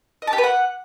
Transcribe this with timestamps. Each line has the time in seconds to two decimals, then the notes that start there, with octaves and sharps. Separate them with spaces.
0.22 D#5
0.27 A5
0.33 G4
0.38 B4
0.44 F#5